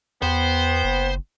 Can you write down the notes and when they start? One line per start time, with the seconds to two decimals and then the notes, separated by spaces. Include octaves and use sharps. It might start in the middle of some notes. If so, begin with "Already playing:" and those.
0.22 E2 B3 C5 G5
0.84 F#1